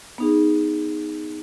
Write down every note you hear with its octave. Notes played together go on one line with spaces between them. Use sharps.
B3 D#4 G#4